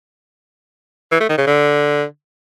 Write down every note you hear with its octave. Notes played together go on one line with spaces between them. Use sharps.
E3
A3
D#3
C#3
D3